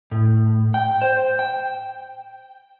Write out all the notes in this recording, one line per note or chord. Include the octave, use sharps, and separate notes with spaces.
A2
G5
C5
G5